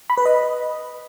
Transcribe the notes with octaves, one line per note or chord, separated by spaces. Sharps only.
B5
B4
D#5